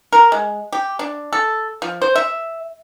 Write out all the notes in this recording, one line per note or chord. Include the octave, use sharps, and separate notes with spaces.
A#4
G#3
G4
D4
A4
F3
C5
E5